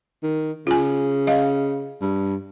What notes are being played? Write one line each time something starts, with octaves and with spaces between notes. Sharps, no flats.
D#3
C#3 F4 G#5
D#5 F5
G2